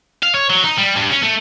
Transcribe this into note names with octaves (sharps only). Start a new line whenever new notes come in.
F5
C#5
F#3
D#4
G3
G2
C#4
A3